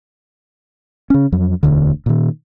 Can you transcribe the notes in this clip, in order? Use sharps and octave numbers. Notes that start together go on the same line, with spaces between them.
C#3 C#4
F2 F#3
E1 D2 D3
A#2 D#3